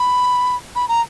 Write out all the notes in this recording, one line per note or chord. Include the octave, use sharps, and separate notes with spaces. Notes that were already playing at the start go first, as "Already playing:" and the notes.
Already playing: B5
B5
A#5